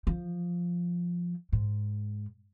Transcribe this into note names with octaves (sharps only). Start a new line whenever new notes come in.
F3
G#2